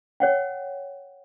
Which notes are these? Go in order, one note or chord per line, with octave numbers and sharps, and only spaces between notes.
C#5 F#5 G5